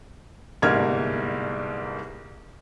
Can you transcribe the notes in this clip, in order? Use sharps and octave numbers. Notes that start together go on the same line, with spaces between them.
G1 C2 G#2 A#3 F6 G#6